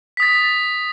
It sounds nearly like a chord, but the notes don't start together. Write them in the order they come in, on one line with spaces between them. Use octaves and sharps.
B6 D#6 A6